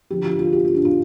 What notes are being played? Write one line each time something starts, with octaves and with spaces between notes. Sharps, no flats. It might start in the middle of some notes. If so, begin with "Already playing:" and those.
D3 F3 D4 G4
F4
F4
G4
F4
D4
F4